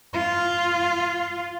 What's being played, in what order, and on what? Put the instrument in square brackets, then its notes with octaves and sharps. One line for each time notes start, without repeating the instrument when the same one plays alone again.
[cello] F4